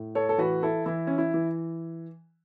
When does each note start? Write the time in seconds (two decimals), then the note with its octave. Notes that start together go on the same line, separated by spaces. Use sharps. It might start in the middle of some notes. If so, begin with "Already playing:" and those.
Already playing: A2
0.15 A4 C#5
0.29 A4
0.38 E3 F#4 B4
0.63 E4 A4
0.86 E3 E4
1.07 C#4
1.18 E4
1.34 E3